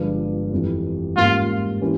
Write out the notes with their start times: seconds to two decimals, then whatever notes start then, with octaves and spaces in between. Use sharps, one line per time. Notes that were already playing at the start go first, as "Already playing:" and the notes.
Already playing: G1 G2 F3 G#3
0.52 F2 E3 G3
1.16 G#2 G3 A#3 C#4 F4 G4
1.81 E3 C#4 G4